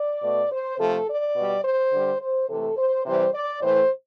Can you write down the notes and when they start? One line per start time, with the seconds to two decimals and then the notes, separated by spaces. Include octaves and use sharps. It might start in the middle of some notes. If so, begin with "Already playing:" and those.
Already playing: D5
0.23 B2 A3
0.52 C5
0.79 C3 F3 A3 A4
1.08 D5
1.36 B2 G3
1.64 C5
1.92 D3 G3
2.21 C5
2.49 C3 E3 A3 A4
2.77 C5
3.06 C3 E3 G3 C5
3.34 D5
3.62 A2 E3 A3 C5